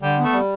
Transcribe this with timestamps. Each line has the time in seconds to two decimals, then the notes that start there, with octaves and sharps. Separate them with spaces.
0.02 D3 G3
0.19 A3 B3
0.33 G3